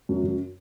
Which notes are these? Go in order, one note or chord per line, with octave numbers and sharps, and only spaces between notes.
F#2
F#2